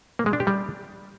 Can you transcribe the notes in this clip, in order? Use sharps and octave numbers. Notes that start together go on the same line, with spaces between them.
A#3
G#3
D4
G4
G3